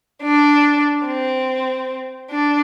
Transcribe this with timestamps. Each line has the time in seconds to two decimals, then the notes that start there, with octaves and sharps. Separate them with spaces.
0.23 D4
1.06 C4
2.31 D4